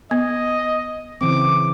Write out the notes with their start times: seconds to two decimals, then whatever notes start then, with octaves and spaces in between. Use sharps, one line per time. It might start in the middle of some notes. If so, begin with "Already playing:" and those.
0.11 B3 D#5
1.21 C#3 E3 C4 D6